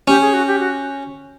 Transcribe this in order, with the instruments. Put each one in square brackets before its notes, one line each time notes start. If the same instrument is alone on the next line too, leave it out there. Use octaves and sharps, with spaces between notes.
[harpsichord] C#4 [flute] G4
[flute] G#4
F#4
G4
F#4